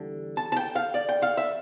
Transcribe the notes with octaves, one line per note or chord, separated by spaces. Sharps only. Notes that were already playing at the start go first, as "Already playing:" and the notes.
Already playing: E2 D3 G3
A5
A5
G5
F5
D5
G5
F5
E5